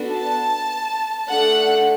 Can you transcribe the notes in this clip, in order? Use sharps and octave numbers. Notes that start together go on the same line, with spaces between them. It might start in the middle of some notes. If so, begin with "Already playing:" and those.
Already playing: B3 D4 F#4 A4
A5
A3 D4 A4 F#5